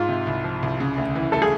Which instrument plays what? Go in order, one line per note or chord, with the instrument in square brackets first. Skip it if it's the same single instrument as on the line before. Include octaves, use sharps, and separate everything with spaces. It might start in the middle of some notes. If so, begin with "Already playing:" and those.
Already playing: [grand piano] G#2 [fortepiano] F4
[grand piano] C3
C2
F3
C2
C#3
D2
E3
[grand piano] A3 [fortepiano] A4
[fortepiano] G#4